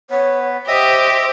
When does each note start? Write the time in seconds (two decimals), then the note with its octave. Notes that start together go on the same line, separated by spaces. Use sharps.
0.10 B3 C#5
0.68 G4 C5 D#5 E5 D#6